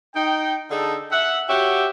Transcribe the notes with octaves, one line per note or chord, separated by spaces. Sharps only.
D#4 G5
D3 D#4 G#4 A4
E5 F#5
F#4 G4 C#5 E5 F#5 G5